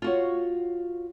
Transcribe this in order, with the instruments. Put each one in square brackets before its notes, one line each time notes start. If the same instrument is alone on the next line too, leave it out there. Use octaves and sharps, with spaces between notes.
[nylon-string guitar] F4 F#4 C#5